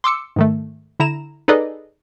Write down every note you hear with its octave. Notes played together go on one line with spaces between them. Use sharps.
C6 D6 E6 C#7
G#2 D#3 A3
D3 E4 A#5 E7
D#4 G#4 A4 B4 D5 D#5